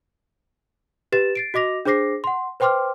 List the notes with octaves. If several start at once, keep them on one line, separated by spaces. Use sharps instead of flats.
G4 B4 A6 E7
A6 C7 D7
F#4 D#5 D6 A#6 F7
D4 G#4 C5 D6 A#6 C7
F#5 C6
B4 C5 G5 C6 D6 F6